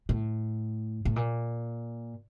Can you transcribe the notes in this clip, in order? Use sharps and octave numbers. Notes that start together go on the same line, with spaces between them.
A2
A2
A#2